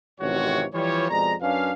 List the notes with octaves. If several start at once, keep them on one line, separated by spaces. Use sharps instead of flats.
A1 F2 C3 D#3 F#4 C#5
E3 F3 G3 C#5
F2 B2 G#3 D5 A#5
F#2 C#4 D4 B4 F5